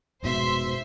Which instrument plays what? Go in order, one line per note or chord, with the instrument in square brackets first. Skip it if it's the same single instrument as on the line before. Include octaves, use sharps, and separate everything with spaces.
[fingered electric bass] F1 G#2 B2 [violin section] C5 E5 C6